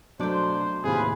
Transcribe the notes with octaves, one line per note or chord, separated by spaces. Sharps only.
B2 F#3 A3 D4 C5 D6
D#2 A2 C3 F4 G#4 B4